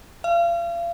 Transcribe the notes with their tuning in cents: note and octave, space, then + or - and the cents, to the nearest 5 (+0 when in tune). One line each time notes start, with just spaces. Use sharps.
F5 -35